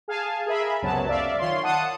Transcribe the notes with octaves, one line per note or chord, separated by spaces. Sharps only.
G#4 F5 G#5 A5
G#4 A#4 E5 B5
C#2 F#2 C3 F#3 B3 A5
D5 E5 F5
D#3 F4 C#5 C6
F#5 A5 D#6 C#7